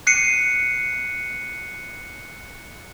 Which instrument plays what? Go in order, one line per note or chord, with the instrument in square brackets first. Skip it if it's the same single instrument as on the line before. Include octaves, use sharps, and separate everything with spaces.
[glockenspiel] F#6 C7 C#7 D#7